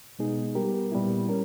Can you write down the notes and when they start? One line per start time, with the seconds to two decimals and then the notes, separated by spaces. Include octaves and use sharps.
0.19 B2 G#3 B3 D#4 G#4
0.55 G3 B3 G4 A#4
0.92 A#2 G3 B3 E4
1.29 G3 C#4 A#4